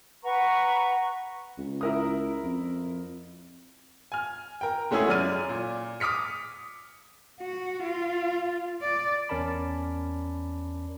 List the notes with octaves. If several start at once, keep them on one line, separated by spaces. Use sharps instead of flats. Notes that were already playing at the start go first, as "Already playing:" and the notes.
B4 F#5 A#5 C#6
C#2
E4 A#4 D#6
F2
G#5 F6
A#4 G5
G#3 A3 C#4 E4 F#4 G#4
F#2 D5 F6 D#7
A#2
D6 D#6 F6 B6 C#7
F#4
F4
D5
E2 C#4 A#4 D5 A5 B5